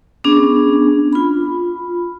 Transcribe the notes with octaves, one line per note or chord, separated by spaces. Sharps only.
B3 C#4 D4 G#4
F4 B5